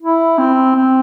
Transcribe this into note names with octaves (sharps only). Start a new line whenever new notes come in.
E4
C4
C4